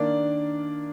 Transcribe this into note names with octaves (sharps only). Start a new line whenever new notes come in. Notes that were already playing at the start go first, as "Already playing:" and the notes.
Already playing: D#3 A#3 D4 D5